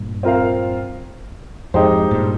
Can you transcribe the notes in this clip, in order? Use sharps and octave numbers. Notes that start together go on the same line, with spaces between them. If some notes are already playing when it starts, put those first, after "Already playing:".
Already playing: G2 A#2
C4 F4 A#4 F5
F2 G#2 G#3 D#4 G4 C5
G2 A#2